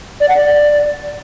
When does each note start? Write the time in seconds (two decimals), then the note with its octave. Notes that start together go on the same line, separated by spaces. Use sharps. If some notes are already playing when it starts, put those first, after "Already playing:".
0.20 D5
0.28 F#5
0.36 D5